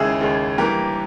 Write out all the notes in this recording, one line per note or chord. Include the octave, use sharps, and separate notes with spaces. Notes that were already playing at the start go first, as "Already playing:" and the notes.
Already playing: D#2 C#3 G#3 E4 G#4
D#2 C#3 G#3
G2 E3 A#3 G4 A#4